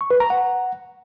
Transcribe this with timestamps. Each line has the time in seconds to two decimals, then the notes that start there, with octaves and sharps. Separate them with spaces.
0.01 C#6
0.11 B4
0.20 A#5
0.30 F#5